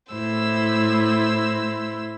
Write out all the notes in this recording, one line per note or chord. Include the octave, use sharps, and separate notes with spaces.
A2 E4 C5 E6